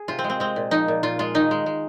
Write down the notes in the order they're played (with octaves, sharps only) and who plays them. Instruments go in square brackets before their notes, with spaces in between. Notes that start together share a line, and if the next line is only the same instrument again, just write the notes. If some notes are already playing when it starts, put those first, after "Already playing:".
Already playing: [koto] G#4
C3 F4
C4
G#3
C4
G#3 C4
A#2
F3 D#4
A#2
A#2 F4
G#3 F4
D#3 D#4
G#3
G#3